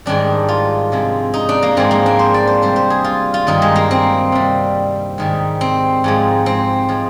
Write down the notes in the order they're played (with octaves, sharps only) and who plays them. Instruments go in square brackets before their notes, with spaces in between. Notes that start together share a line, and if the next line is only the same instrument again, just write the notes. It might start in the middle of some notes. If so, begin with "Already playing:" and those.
[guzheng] G#2 D#3 G3 D4
F4
C3 F3 G#3
D#4
D4
A#3
G#2 F3 G#3 C4
A#3
D4
C5
D5
C5
C3 G3 C5
C5
G#4
F4
F4
G2 D#3 G3 D#4
G#3
A#3
C4
C3 G3
G#2 D#3 G3
C4
G#2 F3 G#3
C4
F3 G#3